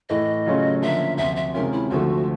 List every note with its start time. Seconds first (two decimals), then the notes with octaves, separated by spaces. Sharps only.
0.09 A2 E3 A3 D#5
0.46 C#3 F#3 A3 C#4 F4
0.82 D3 F3 A#3 C#4 E5
1.17 D2 C3 F3 E5
1.36 E5
1.54 C3 D#3 G#3 C#4 F4 A#4
1.72 E4
1.90 D2 D3 F3 A3 F#4